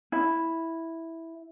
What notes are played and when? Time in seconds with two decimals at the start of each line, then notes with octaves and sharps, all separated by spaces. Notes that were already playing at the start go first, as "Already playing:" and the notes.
0.12 E4